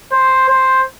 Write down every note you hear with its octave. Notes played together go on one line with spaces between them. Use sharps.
C5
C5